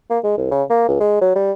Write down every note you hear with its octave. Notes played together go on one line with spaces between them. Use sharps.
A#3
G#3
C2
C#3
A#3
C#2
G#3
F#3
G3